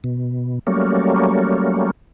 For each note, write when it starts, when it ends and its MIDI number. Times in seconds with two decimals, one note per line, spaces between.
0.04 0.59 47
0.67 1.91 54
0.67 1.91 55
0.67 1.91 57
0.67 1.91 58
0.67 1.91 61